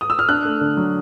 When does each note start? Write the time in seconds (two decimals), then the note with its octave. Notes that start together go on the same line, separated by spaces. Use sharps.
0.01 D#6
0.10 E6
0.19 F6
0.29 D4 F#6
0.45 A3
0.61 D3
0.77 F#3